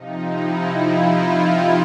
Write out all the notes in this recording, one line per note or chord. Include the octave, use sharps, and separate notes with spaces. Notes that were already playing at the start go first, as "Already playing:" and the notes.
Already playing: C3 F3 D#4
E4
F4
E4
E4